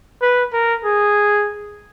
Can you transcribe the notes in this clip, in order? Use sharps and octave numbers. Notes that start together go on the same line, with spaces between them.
B4
A#4
G#4